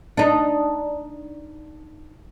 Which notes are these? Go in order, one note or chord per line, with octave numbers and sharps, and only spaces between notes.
D4 D#4